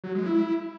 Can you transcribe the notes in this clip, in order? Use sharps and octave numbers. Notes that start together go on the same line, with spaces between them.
F#3
G#3
E4